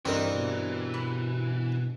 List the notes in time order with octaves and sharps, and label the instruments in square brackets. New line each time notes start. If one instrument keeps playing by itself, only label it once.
[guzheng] G2 [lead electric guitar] E3 [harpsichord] C4 D#4 A#4
[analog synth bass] B2
[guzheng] B4